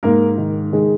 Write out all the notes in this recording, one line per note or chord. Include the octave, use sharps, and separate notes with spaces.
G#2 A#3 A#4
D#3
D#3 G#3 G#4